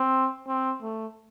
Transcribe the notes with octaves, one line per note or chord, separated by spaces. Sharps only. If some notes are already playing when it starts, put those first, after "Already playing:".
Already playing: C4
C4
A3